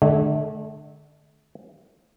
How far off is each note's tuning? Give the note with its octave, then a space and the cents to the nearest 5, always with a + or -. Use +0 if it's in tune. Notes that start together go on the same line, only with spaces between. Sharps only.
D3 +25 A3 -30